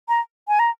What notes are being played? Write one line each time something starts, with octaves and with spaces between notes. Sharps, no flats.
A#5
G#5
A#5